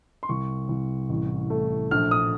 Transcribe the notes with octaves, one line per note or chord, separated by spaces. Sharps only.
C6
C2 C#6
C2
A1
A3
A#1 F6
D#6